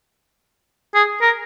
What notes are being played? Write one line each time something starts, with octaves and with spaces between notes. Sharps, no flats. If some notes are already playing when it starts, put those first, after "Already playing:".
G#4
A#4